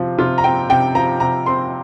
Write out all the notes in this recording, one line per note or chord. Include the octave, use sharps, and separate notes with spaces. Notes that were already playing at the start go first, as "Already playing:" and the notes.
Already playing: C3 F3
C3 F4
A#5
C4 G5
C3 G5
F3 A#5
C3 A#5
C4 C6